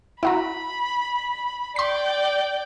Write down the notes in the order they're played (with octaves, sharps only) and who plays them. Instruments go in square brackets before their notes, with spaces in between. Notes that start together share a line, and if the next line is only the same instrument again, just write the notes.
[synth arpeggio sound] E4 F#4 A#5 [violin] B5
[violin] D5 G5 [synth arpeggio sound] C6 B6